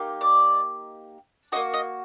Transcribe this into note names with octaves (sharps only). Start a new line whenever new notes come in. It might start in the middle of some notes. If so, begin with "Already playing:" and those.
Already playing: A#3 D#4 G4
D5
A#3 D#4 F#4 D#5
D#5